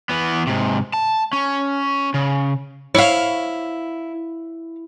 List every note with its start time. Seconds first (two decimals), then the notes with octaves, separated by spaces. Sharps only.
0.09 E3 B3
0.47 G#2 C3
0.94 A5
1.33 C#4
2.14 C#3
2.95 E4 C#5 F5